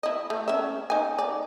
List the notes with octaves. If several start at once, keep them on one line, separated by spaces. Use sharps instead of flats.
E4 D#5
A3
C#4 E5
D#4 G#5
D5